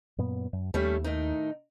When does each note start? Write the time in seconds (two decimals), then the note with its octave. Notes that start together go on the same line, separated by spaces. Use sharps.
0.18 F#2 A#2 B3
0.53 F#2
0.74 D#2 G3 A3 C#4
1.04 A2 D#3 D#4